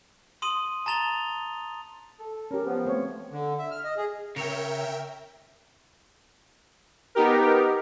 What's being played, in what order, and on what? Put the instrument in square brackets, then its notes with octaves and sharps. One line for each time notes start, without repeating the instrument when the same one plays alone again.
[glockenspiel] C6 D#6 D#7 F#7
A5 A#5 A6 F7 G7
[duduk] A4
[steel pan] C#4 G4 [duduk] A#4
[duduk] F3 [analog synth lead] B3
[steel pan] A3 C4 C#5
[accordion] D3
E5
F6
D#5
G#4
[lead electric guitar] C#3 C#5 [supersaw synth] A#4 E5 G5
[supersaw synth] B3 D#4 G4 A#4